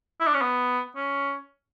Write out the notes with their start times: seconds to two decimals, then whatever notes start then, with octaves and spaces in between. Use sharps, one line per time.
0.20 E4
0.27 D4
0.34 C#4
0.42 B3
0.96 C#4